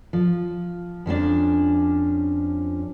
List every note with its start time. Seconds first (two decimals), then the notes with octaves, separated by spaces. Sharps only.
0.13 F3
1.06 F2 F3 C#4 D4